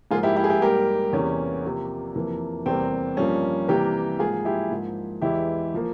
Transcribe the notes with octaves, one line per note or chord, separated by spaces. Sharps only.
G#2 F3 A#3 F4 G#4
E4 G4
E4 G4
G#4
E4 G4
G#2 G3 A#3 G4 A#4
E2 C3 E3 A#3 C#4
C3 F3 A#3
F2 C3 E3 A#3
E2 C3 G3 A#3 C4
G2 F3 A#3 C#4
C3 E3 G3 A#3 G4 A#4
G#2 F3 A#3 F4 G#4
E4 G4
G#2 F3 A#3
E2 E3 G#3 E4 G4
F3 A#3